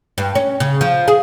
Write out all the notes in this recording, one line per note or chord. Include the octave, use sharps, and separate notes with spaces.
G2
C#4
C#3
F3
G#4